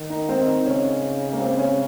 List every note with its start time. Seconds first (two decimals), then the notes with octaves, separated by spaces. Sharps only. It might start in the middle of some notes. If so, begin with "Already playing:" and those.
Already playing: D#3
0.10 D#4
0.29 C4
0.47 D#4
0.66 C#3 C#4
1.33 A#3
1.40 C4
1.59 C#4